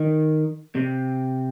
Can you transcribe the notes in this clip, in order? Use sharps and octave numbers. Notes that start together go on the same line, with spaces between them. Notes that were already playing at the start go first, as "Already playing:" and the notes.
Already playing: D#3
C3